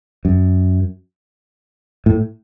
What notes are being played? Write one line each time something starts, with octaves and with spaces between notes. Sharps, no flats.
F#2
A2